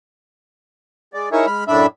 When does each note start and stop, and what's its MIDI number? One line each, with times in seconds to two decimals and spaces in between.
1.14 1.29 56
1.14 1.29 74
1.32 1.46 63
1.32 1.46 64
1.32 1.46 68
1.32 1.46 70
1.32 1.46 73
1.32 1.46 76
1.46 1.64 56
1.46 1.64 83
1.46 1.64 89
1.68 1.86 42
1.68 1.86 45
1.68 1.86 62
1.68 1.86 76
1.68 1.86 83